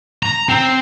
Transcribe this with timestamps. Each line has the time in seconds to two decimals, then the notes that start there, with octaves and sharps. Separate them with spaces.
0.23 A#5
0.49 C4